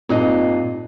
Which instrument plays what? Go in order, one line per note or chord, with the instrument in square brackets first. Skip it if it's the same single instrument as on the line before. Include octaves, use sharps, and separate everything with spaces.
[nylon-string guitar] G2 A#2 D#4 [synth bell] C4 F4